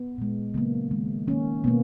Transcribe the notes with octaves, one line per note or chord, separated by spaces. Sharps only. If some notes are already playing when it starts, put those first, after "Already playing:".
Already playing: B3
A#2 G#3
C#3 F#3 A#3 B3
D#3 G#3
D#3 A#3 C#4
B2 A#3 B3